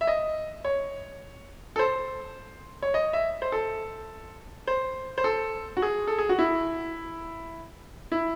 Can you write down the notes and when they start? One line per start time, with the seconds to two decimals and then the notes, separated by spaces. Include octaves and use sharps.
0.01 E5
0.07 D#5
0.65 C#5
1.76 A4
1.79 C5
2.82 C#5
2.94 D#5
3.13 E5
3.42 C5
3.52 A4
4.67 C5
5.18 C5
5.24 A4
5.77 F#4
5.82 G#4
6.07 A4
6.18 G#4
6.29 F#4
6.39 E4
8.12 E4